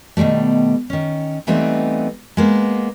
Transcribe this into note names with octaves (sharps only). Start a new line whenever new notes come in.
B2 D#3 F3 G3 A3
D#3 C#4
E3 G3 A3 B3 C4 D#4
G#3 A#3 B3